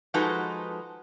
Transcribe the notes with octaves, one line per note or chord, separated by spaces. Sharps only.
F3 G#3 D#4 F#4 A4 B4